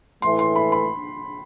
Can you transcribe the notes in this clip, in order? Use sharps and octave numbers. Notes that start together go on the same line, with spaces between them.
A2 E3 A3 C6
C6
B5
B5